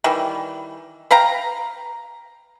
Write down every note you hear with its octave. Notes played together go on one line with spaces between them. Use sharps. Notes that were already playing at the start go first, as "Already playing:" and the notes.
D#3 E3 G3
B4 F5 G5 A#5